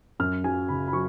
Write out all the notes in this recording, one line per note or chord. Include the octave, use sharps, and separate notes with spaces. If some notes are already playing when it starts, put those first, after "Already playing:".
F#2 F6
F#3 G#5
C#3 B5
B5
F#3 C#6